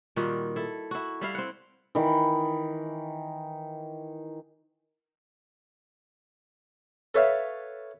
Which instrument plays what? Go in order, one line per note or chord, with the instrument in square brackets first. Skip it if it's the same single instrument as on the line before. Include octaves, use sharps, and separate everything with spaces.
[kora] A#2 D#3 G3 F#4
E4 A4
E4 F#4
G3 E4 F5
C4 F#5
[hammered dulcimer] D#3 E3
[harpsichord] A4 B4 C#5 E5 F5